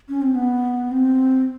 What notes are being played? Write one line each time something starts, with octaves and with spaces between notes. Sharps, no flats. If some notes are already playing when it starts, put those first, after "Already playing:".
C#4
C4
B3
C4